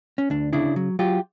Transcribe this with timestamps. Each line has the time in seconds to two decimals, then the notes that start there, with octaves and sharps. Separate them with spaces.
0.18 C#4
0.30 D2 D4
0.53 C#3 D4 E4
0.76 F#3
0.99 F#3 F4 G4